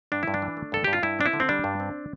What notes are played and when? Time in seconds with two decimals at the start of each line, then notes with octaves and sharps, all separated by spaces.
0.12 G2 D4
0.23 G2 E4
0.34 D4
0.42 E3
0.57 A3
0.72 G2 A4
0.84 G2 G4
0.93 F4
1.03 G2 E4
1.19 C4 D4
1.26 E4
1.33 D3
1.40 C4
1.49 G3 D4
1.64 G2
1.80 C4